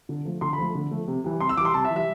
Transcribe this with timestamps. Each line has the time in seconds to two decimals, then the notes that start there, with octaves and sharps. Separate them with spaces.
0.09 D3
0.25 F3 A3
0.41 D3 C6
0.53 B5
0.58 F3 A3
0.75 D3
0.91 F3 A3
1.07 C3
1.24 E3 G3
1.40 C3 C6
1.49 E6
1.57 E3 D6
1.61 G3 C6
1.74 C3 A5
1.84 E5
1.90 E3
1.95 G3 E5